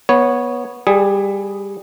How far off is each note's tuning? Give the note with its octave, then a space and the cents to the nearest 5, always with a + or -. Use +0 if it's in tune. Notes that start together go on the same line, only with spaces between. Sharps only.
B3 -15 C#5 +0
G3 +15 G#4 -5